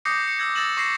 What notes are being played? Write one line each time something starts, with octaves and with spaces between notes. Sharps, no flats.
D6 D#6 G6 A#6 C7 C#7
C#7
E6 G6 G#6 A#6
E6 A6 A#6 E7 F#7
C#6 D6 A#6 C7 E7